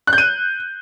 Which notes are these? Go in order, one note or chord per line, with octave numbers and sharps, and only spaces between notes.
F#6
G6
D#7